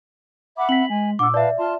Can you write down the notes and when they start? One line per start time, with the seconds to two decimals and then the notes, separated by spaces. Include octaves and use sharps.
0.57 E5 F#5 B5 D6
0.69 C4 B6 F#7
0.90 G#3 G#5
1.19 A#2 D4 F#5 D6 E6
1.34 B4 D5 E5 F5 A5
1.58 F4 A5 C6